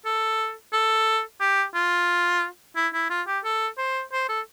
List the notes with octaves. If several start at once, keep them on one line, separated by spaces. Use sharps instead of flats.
A4
A4
G4
F4
E4
E4
F4
G4
A4
C5
C5
A4